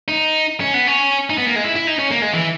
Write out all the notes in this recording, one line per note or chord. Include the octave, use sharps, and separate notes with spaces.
D#4
C#4
B3
C#4
D#4
B3
A#3
G#3
E4
E4
D#4
C#4
A#3
G#3
E3